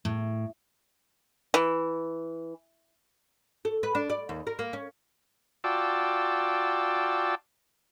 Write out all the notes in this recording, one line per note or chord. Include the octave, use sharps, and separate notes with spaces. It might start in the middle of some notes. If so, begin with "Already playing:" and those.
A2
E3
A4
B4
D4
D5
D#2
A#4
A#3
C#4
F4 F#4 D5 G5 A5 E6